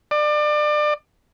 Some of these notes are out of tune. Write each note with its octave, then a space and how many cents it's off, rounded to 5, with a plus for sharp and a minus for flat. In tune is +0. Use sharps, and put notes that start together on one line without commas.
D5 +30